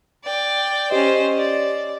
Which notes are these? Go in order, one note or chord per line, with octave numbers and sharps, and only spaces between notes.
D5 G5
C#4 G4 C5 D#5
D5